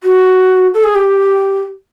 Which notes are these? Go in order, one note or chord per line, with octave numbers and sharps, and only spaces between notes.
F#4
A4
G#4
G4